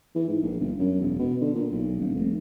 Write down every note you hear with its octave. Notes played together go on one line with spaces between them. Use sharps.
E3
G#2
A#1
G1
F#2
E1
B2
D3
A#2
B1
D#1
F1